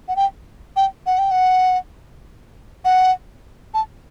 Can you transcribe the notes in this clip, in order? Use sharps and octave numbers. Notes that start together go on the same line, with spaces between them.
F#5
G5
G5
F#5
G5
F#5
F#5
A5